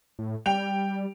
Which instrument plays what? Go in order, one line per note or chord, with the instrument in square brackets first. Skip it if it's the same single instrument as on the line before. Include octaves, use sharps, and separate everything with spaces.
[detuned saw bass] A2
[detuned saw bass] G3 [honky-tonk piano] G5 F7